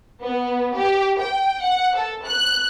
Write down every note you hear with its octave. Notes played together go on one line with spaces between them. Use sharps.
B3
G4
G5
F#5
A4
F#6